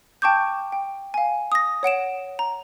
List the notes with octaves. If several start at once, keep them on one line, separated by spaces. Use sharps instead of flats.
G5 A5 C#6 D6 G6
G5
F5 G#5
D#6 A#6
C#5 F#5 D7 E7
A#5